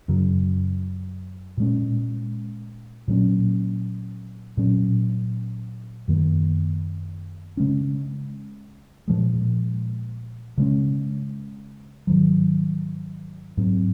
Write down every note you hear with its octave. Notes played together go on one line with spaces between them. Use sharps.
F#2 C#3 F#3
A#2 G#3 C#4
A#2 F#3 A#3 C#4
A#2 F#3 C#4
F#2 D#3 A#3
C#3 G#3 C#4
A#2 F3 G#3
C#3 G#3 C#4
G#2 D#3 F#3
G#2 F#3 C4